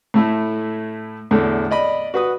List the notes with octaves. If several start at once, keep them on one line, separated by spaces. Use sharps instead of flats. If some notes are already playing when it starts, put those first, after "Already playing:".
A2 A3 E4
E2 A2 D3
D5 D#5 B5
F#4 B4 D#6